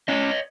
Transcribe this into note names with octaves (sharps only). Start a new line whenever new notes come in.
C#4 C#5 D#5